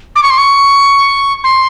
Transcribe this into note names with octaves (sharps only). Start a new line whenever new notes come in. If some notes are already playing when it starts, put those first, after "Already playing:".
D6
C#6
C6
C#6
C6